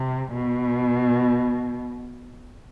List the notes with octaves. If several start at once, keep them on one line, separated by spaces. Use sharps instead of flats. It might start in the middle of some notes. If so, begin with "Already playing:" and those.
Already playing: C3
B2